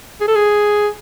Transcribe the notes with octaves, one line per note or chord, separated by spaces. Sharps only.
G#4
A4
G#4